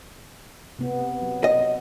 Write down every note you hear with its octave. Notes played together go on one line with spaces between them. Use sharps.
C3 B3
F#3
D#5